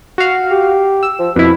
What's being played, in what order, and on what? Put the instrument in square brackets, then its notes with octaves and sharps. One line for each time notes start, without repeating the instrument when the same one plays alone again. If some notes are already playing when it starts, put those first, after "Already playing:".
[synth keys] F#4 F5
[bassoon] G4
[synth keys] E6
[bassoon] F3
[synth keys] F2 E4 [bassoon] B2